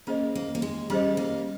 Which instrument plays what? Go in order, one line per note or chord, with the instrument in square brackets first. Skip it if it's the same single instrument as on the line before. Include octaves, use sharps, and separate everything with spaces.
[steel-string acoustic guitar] A#3 [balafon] C#4 G#4 C5 D#5
[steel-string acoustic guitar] A#3
A#3
G#3
[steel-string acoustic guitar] G3 [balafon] C#4 G#4 C5 D#5
[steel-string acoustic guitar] A#3